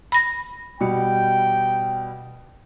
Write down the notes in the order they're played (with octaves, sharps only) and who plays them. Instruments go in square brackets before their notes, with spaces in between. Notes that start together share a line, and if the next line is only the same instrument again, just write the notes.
[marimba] B5 A#6
[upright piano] B2 G3 C#7 [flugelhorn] G5